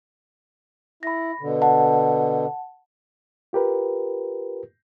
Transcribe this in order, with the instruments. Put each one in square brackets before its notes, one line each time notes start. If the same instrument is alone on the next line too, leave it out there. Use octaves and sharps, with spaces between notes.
[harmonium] E4 [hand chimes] B5 A#6
[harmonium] B2 D3
[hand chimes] F#5 A5
[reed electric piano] F4 G4 A#4 B4